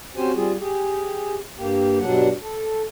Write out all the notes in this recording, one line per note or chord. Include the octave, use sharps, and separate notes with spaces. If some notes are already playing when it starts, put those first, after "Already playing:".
C4 C#4 F#4 G4 C5 G#5
G3 C4 F4 G#4
G4 G#4
G2 A#3 G4
G2 B2 F#3 G3 D4 F#5
A4